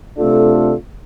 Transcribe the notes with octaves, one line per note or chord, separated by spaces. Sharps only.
C3 A3 D4 F4 A4